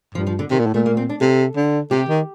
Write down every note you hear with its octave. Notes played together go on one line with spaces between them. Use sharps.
G2 F3
F3
D3
C3 D#3
A#2
A2
A#2 A3
A#3
C4
D4
C3 A4
D3
C3 G4
D#3